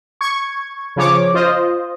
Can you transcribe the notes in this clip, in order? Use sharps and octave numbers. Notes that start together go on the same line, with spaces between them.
C#6 G#6
C#3 F3 C#5 D6
F4 C5 D#5